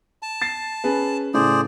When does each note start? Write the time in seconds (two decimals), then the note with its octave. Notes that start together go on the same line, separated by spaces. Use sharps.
0.22 A5
0.42 A6 C7
0.84 C#4 G#4 B4
1.34 A2 C#3 A3 G#4 C5 D5